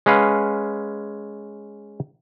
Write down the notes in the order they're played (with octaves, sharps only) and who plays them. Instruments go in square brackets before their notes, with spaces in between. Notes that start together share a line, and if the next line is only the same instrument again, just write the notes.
[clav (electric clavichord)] G#3 C#4 B4 F5